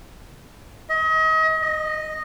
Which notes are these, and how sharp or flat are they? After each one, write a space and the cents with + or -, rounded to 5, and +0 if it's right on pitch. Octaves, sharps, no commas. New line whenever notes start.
D#5 +35
D#5 -10